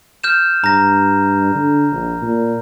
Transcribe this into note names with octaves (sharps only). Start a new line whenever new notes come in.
F6 G6 E7
G2 A#5 A#6
D3
A#1
A#2